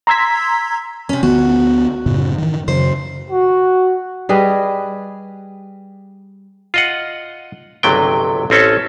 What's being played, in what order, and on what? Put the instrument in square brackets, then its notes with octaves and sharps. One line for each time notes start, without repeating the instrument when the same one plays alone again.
[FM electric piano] A#5 C6 E6 G#6 B6
[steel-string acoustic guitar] C3 C#4
[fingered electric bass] D2 D3 B3 [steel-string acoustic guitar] F#4
[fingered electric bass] F#2 A2 C#3
D#3 E3
[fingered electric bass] F#2 C#3 [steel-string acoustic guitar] C5
[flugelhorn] F#4
[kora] G3 G#4 B4 D#5
[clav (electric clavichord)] F4 D#5 F#5
G1 C#2 C3 F#3 A3 G5
A1 C4 C#4 A4